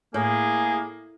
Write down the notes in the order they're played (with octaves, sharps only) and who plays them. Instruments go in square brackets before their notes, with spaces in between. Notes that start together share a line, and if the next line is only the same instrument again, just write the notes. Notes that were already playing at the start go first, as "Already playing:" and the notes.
[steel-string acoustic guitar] A2 [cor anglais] A#3 [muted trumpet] G#4